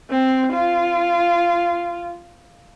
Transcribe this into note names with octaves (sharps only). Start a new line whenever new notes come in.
C4
F4